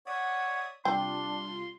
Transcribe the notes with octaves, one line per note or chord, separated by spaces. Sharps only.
C#5 D5 E5 F#5 D#6
C3 G3 C4 D4 F4 G5 C6